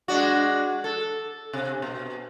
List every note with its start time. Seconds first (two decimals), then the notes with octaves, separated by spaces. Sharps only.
0.08 G#3 D4 F#4
0.84 A4
1.53 C3
1.82 B2